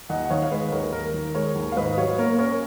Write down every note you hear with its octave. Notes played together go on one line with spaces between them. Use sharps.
D#2 D#5 F#5
F#5
D#3 C#5 F5
F5
G#3 B4 D#5
D#2 A#4 C#5
D#2 A#4
D#3
G#3 A#4 C#5
D#2
F5
G#2 B4 D#5
F#3 C#5 F5
A#3 A#4 C#5
C#4 A#4 C#5